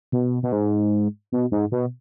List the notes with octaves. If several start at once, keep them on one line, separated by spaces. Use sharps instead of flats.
B2
B2
G#2
B2
G#2
B2